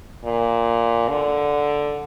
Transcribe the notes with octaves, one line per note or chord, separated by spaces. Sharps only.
A#2
D3